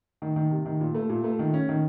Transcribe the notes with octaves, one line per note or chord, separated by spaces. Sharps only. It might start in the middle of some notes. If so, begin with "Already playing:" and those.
D#3
D#3
C3
D#3
A#2
A3
A#2
A3
D#3
C#4
D#3